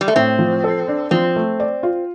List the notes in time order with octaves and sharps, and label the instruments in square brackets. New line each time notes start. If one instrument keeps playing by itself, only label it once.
[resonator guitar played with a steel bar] G3
A3
[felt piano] A2 [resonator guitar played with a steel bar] C4
[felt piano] F3
A4
D4
[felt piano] F3 [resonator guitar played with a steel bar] C4
[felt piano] A3
D5
F4